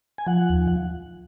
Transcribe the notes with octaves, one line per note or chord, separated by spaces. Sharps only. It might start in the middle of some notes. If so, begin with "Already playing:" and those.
G#5
F3 F#5
D#2